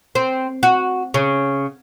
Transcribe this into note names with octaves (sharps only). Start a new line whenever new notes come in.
C4
F#4
C#3